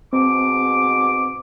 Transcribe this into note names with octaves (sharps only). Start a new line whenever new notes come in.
G#2 B2 C4 D6